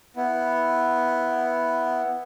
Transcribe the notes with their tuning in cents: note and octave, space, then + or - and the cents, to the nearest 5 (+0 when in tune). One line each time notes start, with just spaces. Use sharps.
B3 +0 E4 +0